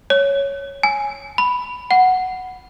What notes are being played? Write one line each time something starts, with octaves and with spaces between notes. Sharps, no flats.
C#5
G#5
B5
F#5